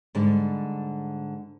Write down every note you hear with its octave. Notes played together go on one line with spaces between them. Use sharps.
G#2 D3 G3